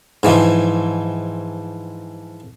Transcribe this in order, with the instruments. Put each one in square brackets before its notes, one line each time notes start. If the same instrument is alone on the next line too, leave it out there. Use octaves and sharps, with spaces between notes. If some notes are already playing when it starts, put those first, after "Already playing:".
[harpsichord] G#2 E3 F3